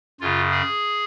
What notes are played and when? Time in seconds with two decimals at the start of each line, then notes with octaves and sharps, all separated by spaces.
0.21 F#2 C#3 F4
0.51 G#4